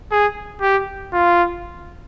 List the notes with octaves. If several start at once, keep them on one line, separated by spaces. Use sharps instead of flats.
G#4
G4
F4